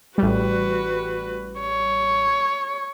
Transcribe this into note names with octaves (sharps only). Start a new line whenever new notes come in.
A1 G3 F#4 B4
C#5